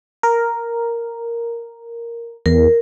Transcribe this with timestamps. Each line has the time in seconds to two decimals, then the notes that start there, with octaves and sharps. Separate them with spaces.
0.23 A#4
2.46 E2 A#4